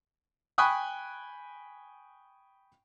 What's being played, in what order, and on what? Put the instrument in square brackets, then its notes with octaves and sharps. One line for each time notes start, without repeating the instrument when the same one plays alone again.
[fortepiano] G5 G#5 B5 C#6 D#6 F#6